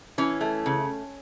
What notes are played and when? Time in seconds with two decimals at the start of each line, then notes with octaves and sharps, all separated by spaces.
0.18 E3 C#4
0.41 A3
0.66 C#3